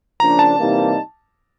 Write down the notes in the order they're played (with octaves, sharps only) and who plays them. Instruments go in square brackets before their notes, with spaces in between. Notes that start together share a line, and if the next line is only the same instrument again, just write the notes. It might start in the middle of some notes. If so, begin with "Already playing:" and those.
[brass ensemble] C#3 F3 A#3 D4 [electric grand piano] A#5
[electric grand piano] A5
[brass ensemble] C3 E3 G3 A#3 D#4